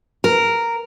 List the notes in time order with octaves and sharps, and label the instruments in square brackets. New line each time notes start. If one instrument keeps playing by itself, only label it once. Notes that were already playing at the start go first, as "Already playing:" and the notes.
[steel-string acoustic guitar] A#4